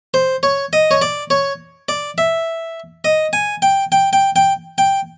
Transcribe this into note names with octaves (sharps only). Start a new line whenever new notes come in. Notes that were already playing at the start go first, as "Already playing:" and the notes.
C5
C#5
D#5
C#5
D5
C#5
D5
E5
D#5
G#5
G5
G5
G5
G5
G5